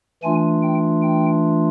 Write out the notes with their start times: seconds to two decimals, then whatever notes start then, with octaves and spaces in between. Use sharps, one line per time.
0.23 E3 A3 D4 F4 G#5
0.63 G5
1.02 G5